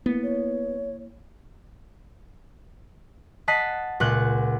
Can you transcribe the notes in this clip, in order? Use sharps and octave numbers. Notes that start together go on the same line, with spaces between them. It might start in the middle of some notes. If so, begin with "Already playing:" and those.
A#3 B3 E4
C#5
D#5 F#5 A5 B6 C7
C#2 A#2 F#5 F#6 G6